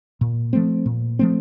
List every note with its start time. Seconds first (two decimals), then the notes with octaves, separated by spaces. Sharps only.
0.21 A#2
0.53 F3 A3 C4
0.86 A#2
1.19 F3 A3 C4